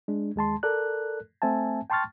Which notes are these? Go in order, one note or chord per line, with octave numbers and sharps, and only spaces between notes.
G#3 D4
D#2 G#3 A5 C6
A4 A#4 D5 F#6
A3 C4 E5 G#5 A5
G5 A5 C6 C#6 F6 A6